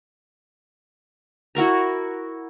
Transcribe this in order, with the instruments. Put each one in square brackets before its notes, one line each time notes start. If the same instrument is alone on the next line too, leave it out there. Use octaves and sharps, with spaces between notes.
[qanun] E4 F#4 A#4 A#5